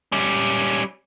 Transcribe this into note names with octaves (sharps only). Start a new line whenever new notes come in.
G3 C#4